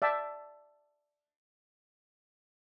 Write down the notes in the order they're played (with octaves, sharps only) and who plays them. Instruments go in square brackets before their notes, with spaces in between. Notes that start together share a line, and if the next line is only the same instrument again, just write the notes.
[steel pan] D5 E5 G5 A5